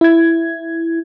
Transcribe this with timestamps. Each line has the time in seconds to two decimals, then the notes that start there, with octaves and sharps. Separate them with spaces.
0.01 E4 G#6